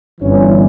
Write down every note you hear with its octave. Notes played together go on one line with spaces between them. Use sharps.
G1 G2 E3 C#4